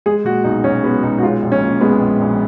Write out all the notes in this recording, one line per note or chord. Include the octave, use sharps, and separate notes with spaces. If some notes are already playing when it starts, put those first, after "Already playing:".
G#3 G#4
A#2 F#4
B1 D#4
B1 C#4
G#3 B3
B1 D#4
F#4
G#3 F4
A#1
C#4
A#2
G#3 B3
A#1
A#1